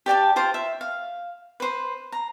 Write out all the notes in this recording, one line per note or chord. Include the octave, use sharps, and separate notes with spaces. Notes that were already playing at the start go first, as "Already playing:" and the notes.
G4 D5 G5 A5
F4 C5 G5 C6
E5
F5
B4 C5
A#5